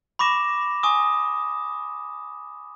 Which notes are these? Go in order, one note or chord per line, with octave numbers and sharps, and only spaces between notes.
B5 C#6 D6 A#6 E7
G#5 C#6 D#6